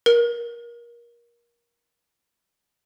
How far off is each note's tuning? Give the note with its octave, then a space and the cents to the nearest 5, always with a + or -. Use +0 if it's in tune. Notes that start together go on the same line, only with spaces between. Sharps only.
A#4 +25